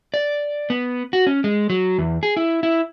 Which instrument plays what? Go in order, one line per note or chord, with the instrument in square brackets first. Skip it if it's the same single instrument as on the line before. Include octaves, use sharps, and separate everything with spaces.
[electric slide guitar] D5
B3
F#4
C#4
G#3
F#3
E2
G#4
E4
E4